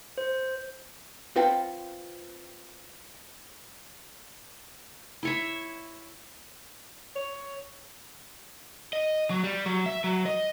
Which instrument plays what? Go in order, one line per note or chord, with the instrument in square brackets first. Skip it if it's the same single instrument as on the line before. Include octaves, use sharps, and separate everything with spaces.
[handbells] C5
[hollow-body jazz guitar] C4 F4 B4 F#5 G5 A5
[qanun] E4 C#5 E5
[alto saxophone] C#5
[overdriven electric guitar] D#5
F#3
G3
F#3
E5
F#3
D#5